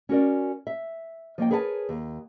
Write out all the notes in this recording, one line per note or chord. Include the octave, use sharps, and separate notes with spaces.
C#4 F#4 A#4 D5
E5
F3 A#3 D#5 G5
G#4 A#4 B4 C#5 F#5 A5
D#2